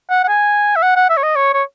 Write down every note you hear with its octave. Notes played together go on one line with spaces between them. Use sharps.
F#5
F#5
G#5
E5
F#5
F#5
E5
C#5
D#5
C#5
C#5